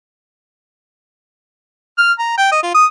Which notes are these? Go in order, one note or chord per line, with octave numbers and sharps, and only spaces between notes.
F6
A#5
G5
D#5
F4
D#6